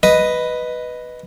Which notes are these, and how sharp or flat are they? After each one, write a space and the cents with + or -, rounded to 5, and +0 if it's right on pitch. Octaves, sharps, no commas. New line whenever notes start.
B4 +0 D#5 +0